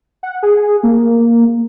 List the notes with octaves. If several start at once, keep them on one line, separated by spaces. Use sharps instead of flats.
F#5
G#4
A#3